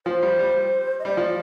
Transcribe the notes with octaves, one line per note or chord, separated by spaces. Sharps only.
F3 C5
G3
G3
D#5
G3 D5
F3